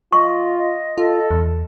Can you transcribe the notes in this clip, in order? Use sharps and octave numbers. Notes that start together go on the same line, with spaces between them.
F4 D#5 C#6
D#5
F4 A4
E2